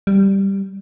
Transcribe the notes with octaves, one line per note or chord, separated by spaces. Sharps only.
G3